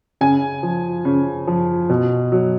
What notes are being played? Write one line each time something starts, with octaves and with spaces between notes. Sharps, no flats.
C#3 G#5
F3
C#3
F3
B2
F#3